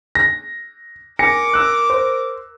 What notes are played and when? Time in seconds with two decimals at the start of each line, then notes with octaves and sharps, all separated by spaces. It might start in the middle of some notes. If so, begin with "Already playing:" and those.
0.15 A#6
1.19 A#4 G#5 D6 A#6 C#7
1.53 E6 F#6
1.90 C5